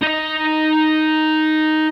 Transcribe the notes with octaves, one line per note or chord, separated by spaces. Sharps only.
D#4 D#5